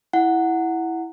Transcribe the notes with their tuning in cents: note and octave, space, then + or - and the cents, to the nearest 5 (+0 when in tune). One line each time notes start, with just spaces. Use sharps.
E4 +0 F#5 +0